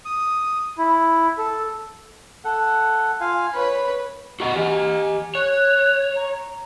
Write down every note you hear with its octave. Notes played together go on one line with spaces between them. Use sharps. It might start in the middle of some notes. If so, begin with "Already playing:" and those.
D#6
E4
A4
A4 F#5
F4 F5 G#5
B4 C#5 B5
F#4 D#5 F#5 A#5
G4 D#5 G#5
C#5 F#6
A#5